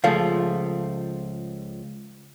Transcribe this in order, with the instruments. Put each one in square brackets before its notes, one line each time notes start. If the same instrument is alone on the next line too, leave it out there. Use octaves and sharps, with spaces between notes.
[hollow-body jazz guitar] C#2 F3 A3 [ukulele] G#4 F5